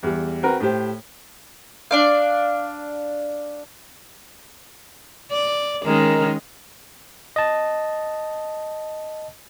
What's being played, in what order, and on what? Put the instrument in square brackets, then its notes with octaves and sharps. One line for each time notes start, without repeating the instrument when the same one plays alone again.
[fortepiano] E2 G3
C4 F#4 A#4 B4
A2 G4 C5
[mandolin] D4 D5 F5
[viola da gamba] D5
[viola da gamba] D#3 G#3 C#4 [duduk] A#4
[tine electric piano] D#5 A5